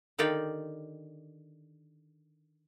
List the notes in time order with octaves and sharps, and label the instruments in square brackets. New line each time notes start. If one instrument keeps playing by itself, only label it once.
[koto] D3 D#3 G4 D5 F5 G5